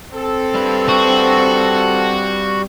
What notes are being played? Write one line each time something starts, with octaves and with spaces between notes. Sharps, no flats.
C4 A4
G3 B4
F#4